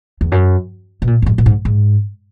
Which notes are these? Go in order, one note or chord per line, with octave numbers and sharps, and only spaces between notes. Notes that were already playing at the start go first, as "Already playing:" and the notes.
E2
F#2
B2
A#2
F#2
G#2
A#2
G#2
G#2